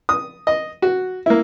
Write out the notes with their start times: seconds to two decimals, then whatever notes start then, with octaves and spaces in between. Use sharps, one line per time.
0.09 D#6
0.47 D#5
0.82 F#4
1.26 A#3 E4